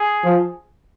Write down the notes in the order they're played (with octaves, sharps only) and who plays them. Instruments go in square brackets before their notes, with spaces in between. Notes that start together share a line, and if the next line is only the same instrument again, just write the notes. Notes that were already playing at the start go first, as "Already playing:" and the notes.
Already playing: [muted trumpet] G#4
[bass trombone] F3